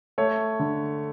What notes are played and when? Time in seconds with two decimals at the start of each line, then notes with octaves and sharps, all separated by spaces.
0.18 A3 C#5
0.59 D3